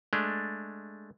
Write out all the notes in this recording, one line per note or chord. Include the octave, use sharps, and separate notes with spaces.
G#3 A3 D4